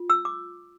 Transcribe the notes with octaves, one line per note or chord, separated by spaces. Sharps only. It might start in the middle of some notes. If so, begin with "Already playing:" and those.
Already playing: F4
E6
D6